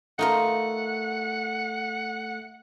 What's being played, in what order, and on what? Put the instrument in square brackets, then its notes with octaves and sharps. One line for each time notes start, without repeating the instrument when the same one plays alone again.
[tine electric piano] A3 [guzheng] D#4 F4 A#4 [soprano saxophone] F#5